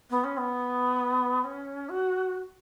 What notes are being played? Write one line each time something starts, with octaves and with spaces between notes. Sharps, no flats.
B3
C#4
B3
C#4
F#4